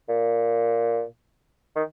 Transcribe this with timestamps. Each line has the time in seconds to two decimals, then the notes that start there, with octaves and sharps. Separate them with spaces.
0.09 A#2
1.76 D#3